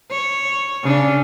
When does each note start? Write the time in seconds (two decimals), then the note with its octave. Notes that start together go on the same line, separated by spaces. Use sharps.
0.11 C#5
0.83 C#3 C#4 D4